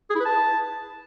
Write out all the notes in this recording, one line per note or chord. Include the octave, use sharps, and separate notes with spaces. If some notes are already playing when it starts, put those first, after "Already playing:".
G#4
E4
B4
A5